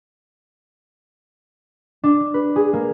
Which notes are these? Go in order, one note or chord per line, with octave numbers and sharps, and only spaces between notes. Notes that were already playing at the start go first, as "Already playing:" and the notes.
D4
B4
G#4
A#3